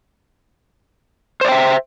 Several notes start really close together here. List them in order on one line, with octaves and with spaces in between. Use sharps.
C5 D5 G5 E5